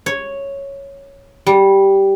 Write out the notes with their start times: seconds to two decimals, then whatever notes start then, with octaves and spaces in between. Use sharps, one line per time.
0.06 C#5
1.46 G3